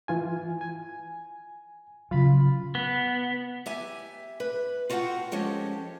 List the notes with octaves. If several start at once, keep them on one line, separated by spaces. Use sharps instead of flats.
E3 F4 G#5
G#5
C#3 F#3 F4 F5 B5
B3
G4 E5 G#5
B4
F4 F#4 A4 D5 F#5 G5
F3 G#3 C#4 G4 A4